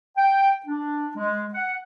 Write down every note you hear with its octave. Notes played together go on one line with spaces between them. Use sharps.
G5
D4
G#3
F#5